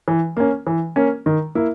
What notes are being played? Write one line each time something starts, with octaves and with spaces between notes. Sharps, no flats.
E3
A#3 C#4
E3
A#3 C#4
D#3
A#3 E4